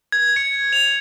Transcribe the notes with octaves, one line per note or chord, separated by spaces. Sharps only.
G#6
C#7
F7